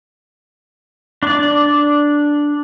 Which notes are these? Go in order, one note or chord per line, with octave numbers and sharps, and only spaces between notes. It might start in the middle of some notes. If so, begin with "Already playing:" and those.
D4 D5